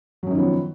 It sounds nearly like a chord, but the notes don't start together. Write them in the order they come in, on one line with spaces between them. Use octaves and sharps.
F#3 F#2 D#3 F3 B3